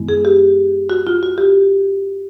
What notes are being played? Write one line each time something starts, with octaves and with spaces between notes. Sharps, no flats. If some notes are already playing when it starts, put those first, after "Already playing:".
Already playing: F#2 D#3 G#3 B3 E4
G#4
G4
F#4
F4
F#4
G4